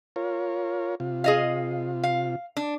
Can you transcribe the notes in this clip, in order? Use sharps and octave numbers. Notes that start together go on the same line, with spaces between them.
F4 A#4 C#5
C3 F4
G#4 D#5 F5
F5
D4